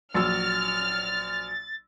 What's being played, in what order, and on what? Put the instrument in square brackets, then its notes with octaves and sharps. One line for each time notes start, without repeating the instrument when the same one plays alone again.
[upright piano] A#1 F#3 E6 [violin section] F6 [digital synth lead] A6